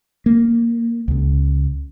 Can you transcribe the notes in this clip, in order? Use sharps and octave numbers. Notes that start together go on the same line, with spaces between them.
A#3
C#2 C#3